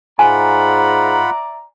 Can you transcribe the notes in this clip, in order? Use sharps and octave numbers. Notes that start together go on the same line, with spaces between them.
G#2 F4 D5 E5 F#5 G#5 A#5 B5